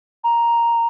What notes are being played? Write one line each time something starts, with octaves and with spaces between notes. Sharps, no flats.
A#5